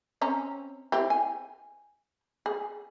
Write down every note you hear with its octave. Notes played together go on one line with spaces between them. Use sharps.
C4 C#4 A#5
C4 E4 G4
G#5
G#4